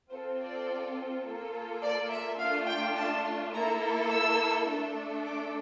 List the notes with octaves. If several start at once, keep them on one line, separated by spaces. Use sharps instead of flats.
C4 F4 A4 C5
D5
A#3 F4 A4
D5
E5
A3 D4 F4 F5
G5
A5
A#3 E4 A4 A#5
E6
A3 D4 A4
D6